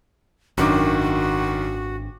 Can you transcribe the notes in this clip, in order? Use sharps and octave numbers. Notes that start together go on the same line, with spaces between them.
G#1 F#2 D#3 D4 F#4 D6